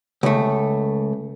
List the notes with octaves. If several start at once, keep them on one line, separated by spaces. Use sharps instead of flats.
C#2 A3